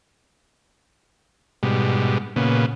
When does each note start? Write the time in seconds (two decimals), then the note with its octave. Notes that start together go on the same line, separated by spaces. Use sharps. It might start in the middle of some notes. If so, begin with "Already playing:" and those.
1.63 G#2 B2 G3
2.36 A#2 C#3 B3